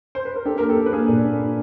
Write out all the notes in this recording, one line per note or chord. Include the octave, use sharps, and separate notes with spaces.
C5
B4
A#4
D4 G4 A4
A#3 A#4
G4 A4
D4
B4
A#3 G#4 A#4
A#2
D4